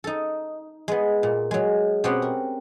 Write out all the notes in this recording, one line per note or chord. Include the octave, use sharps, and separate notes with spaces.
D#4 A4
G#3 B3
A#2
F#3 G#3
B2 C4 C#4 G4 F#5 C6
A#4